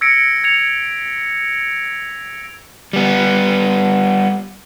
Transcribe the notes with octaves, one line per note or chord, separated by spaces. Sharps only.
E6 G#6 A#6 B6 C#7 D7
G#6 C#7 F7
G3 B3